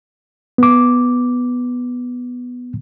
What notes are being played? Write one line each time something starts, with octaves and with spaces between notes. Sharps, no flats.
B3 D6